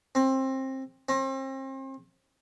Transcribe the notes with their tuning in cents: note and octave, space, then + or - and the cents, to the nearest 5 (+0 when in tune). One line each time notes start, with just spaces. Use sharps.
C4 +20
C4 +35